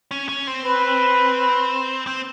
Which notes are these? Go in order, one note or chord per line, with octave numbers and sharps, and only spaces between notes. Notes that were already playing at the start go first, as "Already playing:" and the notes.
C#4
C#4
C4
B4
C4